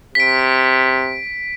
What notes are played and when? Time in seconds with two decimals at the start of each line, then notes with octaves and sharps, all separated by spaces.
0.15 C3 B6 D7